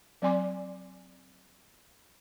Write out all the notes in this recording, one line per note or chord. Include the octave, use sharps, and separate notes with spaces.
F#3 C4 D5 G#5 C6 D6